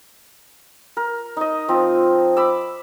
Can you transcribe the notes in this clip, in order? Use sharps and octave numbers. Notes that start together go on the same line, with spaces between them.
A#4
D#4 D#5
F3 C4
B5 D6 E6